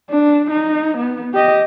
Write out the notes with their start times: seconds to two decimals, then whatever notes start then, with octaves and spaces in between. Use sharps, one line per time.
0.10 D4
0.51 D#4
0.97 B3
1.34 G4 D#5